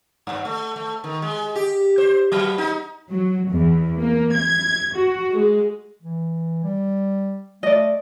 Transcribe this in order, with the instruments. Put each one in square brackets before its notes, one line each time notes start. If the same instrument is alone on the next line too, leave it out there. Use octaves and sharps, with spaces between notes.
[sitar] G2
A3
A3
D#3
G#3
G4
C5
F#3
D#4
[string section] F#3
E2
A#3
G#6
F#4
G#3
[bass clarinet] E3
G3
[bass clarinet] A3 [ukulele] D5 D#5